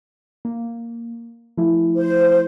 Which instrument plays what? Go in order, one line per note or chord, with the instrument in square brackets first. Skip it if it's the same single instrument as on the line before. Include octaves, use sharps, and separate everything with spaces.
[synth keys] A#3
F3 A3 E4
[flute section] C5